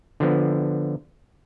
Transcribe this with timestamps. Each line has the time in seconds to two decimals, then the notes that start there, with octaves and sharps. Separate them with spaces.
0.20 D3 F3 B3